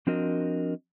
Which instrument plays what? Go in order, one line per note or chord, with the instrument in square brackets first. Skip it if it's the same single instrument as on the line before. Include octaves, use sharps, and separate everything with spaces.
[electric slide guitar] F3 C4 D4 F#4 A#4 D#5